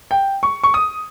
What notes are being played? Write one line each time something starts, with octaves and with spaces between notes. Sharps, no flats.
G5
C#6
C#6
D#6